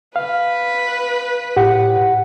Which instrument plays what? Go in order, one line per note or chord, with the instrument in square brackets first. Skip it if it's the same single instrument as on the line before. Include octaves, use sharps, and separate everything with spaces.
[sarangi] B4 [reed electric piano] F5
[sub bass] A2 [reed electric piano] G4 [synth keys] F#5